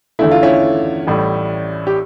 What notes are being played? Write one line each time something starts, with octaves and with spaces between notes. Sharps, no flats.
E2 D3 A3 E4
F4
C#4 E4
A1 A2 G3
G4